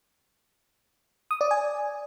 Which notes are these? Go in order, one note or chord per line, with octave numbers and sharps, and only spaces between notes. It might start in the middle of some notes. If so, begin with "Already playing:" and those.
D#6
D5
G#5